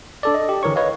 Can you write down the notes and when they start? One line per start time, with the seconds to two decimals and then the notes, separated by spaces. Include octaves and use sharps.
0.23 D4 A4 D5
0.34 D#5
0.49 G4
0.63 D3 E3 A#4 C#5 C#6
0.76 B4 C#5 D#5 F5